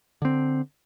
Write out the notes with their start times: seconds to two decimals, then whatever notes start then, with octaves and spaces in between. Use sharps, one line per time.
0.22 D3 C4